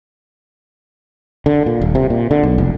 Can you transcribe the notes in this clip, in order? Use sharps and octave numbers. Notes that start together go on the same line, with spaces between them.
D3
A#2
D#1
C3
A#2
D3
B1
F1